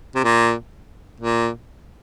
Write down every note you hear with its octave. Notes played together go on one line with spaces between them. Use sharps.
C3
A#2
A#2